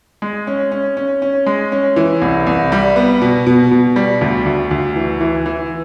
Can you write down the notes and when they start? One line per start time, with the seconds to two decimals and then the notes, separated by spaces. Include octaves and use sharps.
0.22 G#3
0.47 C#4
0.72 C#4
0.97 C#4
1.22 C#4
1.46 G#3
1.72 C#4
1.96 E3
2.22 C2
2.47 C2
2.72 G3
2.96 B3
3.22 B2
3.47 B2
3.71 B2
3.96 G3
4.21 D2
4.46 D2
4.71 D2
4.96 E3
5.21 E3
5.46 E3